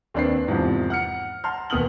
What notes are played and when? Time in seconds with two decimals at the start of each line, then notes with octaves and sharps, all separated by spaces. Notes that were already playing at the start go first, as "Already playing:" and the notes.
0.14 D#2 C4 D4 B4 C7
0.48 E2 G#2 C3 F3
0.90 F#5 F6 C#7
1.44 F#5 A5 A#5 C6 F6
1.70 E1 D#2 B3 D#6 F6 F#7